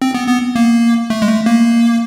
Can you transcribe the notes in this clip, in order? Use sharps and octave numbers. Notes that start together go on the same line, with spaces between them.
C4
B3
B3
A#3
A3
G#3
A3
A#3